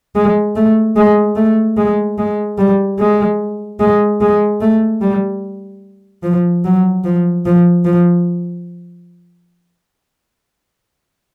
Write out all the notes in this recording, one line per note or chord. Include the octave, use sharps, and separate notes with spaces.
G#3
A3
G#3
A3
G#3
G#3
G3
G#3
G#3
G#3
A3
G3
F3
F#3
F3
F3
F3